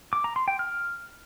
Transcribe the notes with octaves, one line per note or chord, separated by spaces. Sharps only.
D6
A#5
C6
G5
F6